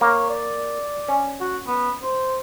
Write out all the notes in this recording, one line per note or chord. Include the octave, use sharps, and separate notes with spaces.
A#3 C#5
D5
C#4
F#4
B3
C5